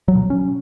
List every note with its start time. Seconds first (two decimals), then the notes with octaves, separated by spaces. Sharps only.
0.08 F#3
0.15 B2
0.30 C#4